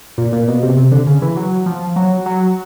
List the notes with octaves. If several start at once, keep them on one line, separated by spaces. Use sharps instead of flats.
A#2
A#2
B2
C3
C3
D3
C#3
E3
F#3
F3
F#3
F#3